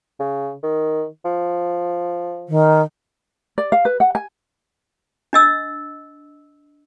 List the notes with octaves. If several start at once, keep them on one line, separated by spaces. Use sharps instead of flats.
C#3
D#3
F3
D#3
D5
F5
B4
F#5
G#5
D4 D#5 E6